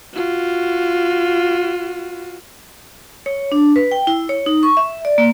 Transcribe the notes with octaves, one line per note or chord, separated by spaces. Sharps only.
F4 F#4
C#5
D4
B4
G5
E4
C#5
D#4
C#6
E5
D5
A#3